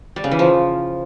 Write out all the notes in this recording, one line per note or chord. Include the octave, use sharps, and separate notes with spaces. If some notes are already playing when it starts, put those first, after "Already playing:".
G3
C#3
E3
F3